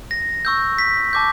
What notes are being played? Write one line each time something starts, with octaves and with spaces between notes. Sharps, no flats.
A#6
C#6 E6 G6
B6
A5 D6 G6